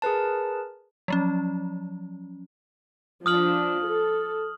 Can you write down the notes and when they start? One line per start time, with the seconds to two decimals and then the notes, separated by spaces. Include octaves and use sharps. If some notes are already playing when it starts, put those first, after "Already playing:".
0.02 G#4 A#4 B4 A5
1.08 F3 F#3 C#4
3.26 F3 D4 D#6 F6 F#7
3.84 A4